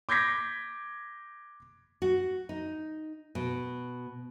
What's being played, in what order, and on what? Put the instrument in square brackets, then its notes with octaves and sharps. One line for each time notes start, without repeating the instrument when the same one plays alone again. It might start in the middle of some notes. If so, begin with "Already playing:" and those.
[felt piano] D6 G6 G#6 A#6 B6
[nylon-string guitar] F#4
D#4
B2